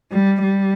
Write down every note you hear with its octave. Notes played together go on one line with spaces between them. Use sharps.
G3
G3